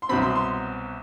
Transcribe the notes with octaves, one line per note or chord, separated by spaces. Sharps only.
C6
C2 B2 F#3 C4 B5
C6
C6